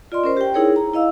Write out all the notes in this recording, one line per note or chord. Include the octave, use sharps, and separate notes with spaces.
F4 D5 D#5 C6
C#4 A#4 C5
G4 G5
D#4 E4 G#4 A#4 C#5
A#5
E4 D#5 F5 E6